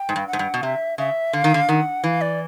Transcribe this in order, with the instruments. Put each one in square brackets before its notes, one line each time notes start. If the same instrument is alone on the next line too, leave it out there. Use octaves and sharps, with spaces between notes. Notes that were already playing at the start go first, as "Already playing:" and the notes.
Already playing: [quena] G5
[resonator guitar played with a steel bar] G#2
G2
[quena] F#5
[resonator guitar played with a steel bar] G#2
G2
B2
[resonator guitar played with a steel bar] C3 [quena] E5
[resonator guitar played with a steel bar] C#3 [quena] E5
[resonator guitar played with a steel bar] D3 [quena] F5
[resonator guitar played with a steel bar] D#3
D3
[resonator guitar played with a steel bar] D#3 [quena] F#5
[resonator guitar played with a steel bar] E3 [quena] F5
[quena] D5